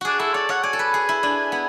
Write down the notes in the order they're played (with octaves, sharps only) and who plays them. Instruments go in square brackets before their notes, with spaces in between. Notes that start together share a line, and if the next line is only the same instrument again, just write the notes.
[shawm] D4 [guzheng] F#4 G#4
[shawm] E4 [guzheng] A4
[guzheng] C#5 [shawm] D5
[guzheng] C#5 [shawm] F#5
[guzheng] D5 [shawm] G#5
[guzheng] A4
B4
G#4
E4
D4
B3